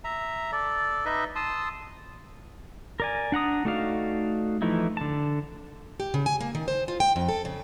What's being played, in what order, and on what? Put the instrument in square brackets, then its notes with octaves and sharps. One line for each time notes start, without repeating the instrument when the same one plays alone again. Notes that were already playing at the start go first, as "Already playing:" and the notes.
[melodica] E5 A#5
A4 D5
D#4 B4 D#5 E5
A5 C6 D#6 E6
[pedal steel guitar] A#4 D5 G#5
D4 F#5 A#5 D#6
A3 D#4 F#4 D5 F5
E3 F3 A3 D#4 E4
D3 A5
[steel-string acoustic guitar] G4
C#3
G#5
A#3
D#3
C5
F4
G5
F2
A4
C#3